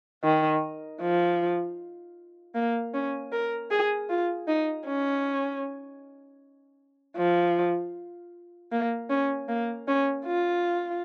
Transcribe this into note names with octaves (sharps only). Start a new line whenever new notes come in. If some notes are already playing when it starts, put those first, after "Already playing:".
D#3
F3
A#3
C#4
A#4
G#4
F4
D#4
C#4
F3
A#3
C#4
A#3
C#4
F4